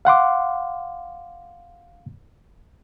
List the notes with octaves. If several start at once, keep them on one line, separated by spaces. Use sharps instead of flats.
F5 F#5 C6 D6